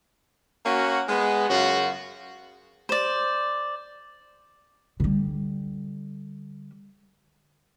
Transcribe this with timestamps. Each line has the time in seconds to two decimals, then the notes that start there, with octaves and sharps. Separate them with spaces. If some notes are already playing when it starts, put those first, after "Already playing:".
0.65 A#3 C#4 F#4
1.08 G#3 B3
1.49 F#2 C#3 F4 F#4
2.89 C5 D5
5.00 D3 G3